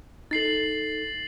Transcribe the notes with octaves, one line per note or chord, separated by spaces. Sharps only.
D#4 A4 A6 C7 F#7